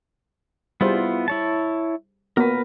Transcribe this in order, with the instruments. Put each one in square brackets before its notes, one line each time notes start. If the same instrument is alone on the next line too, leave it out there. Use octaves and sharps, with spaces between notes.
[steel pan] G3 G#4 C5 [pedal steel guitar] B3 E4 F4
[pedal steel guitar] E4 C#5 A5
[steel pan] A#3 B3 F#4 [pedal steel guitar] A#4 B4